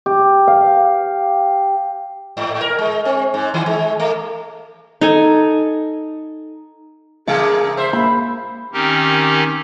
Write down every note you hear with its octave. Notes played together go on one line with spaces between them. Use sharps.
G4
F5
G#2
A#4
G#3
C4
G#2
D#3
G#3
A3
D#4 A4 G#5
C#3 A3 A#3 G#4 F5
C5 E5
A#3 B5
D#3 C4 C#4 D#4 G4 A#4